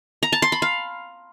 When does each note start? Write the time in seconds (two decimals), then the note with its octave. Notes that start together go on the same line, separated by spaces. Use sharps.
0.23 A#5
0.32 A5
0.42 C6
0.52 B5
0.62 F5